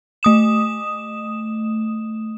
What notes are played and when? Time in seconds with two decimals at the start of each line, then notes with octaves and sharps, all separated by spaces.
0.23 A3 D#6 E7